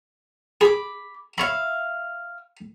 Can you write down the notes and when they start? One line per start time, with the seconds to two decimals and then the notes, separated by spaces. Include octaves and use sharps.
0.61 G#4 B5 D6
1.38 C#5 E5 F5 B5